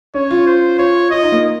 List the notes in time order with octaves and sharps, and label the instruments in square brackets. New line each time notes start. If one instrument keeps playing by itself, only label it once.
[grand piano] C#4 [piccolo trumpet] C#5
[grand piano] F4
[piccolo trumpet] C5
[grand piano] F4 [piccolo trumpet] C#5
[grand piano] F4 [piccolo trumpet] D#5
[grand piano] D#4
A#3